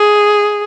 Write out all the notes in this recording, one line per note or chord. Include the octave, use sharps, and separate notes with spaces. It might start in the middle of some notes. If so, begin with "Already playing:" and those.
Already playing: G#4